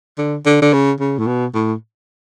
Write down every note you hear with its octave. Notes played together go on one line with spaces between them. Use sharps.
D3
D3
D3
C#3
C#3
A2
B2
A2